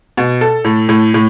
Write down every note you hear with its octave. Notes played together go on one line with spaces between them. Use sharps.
B2
A4
A2
A2
A2